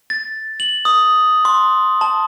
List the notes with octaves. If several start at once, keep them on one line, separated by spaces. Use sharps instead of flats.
A6
F#7
D#6
C6
A5